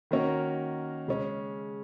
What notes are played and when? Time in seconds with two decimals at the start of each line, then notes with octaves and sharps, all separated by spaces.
0.11 D#3 A#3 C#4 F#4 A#4
1.08 C#3 G#3 C#4